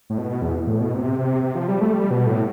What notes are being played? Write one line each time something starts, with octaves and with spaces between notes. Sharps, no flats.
A2
B2
E2
A2
B2
C3
C3
C3
F3
G3
A3
G3
B2
A2